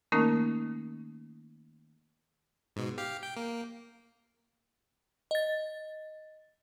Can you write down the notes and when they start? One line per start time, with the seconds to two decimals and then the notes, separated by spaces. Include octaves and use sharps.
0.12 D#3 A3 A#3 C#4 D#4 A#4
2.76 G#2 B2
2.98 G4 F5
3.23 G5
3.37 A#3
5.31 D#5 A6